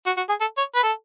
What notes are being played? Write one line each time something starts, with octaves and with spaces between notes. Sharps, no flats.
F#4
F#4
G#4
A4
C#5
B4
A4